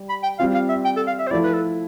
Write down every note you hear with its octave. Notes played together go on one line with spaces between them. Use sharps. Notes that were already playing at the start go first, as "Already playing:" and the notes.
Already playing: G3
B5
G5
G3 C4 F4 F5
F5
E5
G5
A4
F5
E5
C5
F3 A3 E4 D5
B4
A4